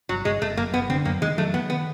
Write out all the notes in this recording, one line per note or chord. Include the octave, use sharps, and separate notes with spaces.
G1 F#3
G1 G#3
G1 A3
F#2 A#3
G1 B3
D3 C4
F#2 A#3
D#3 G#3
F#3 A3
D#3 B3
B3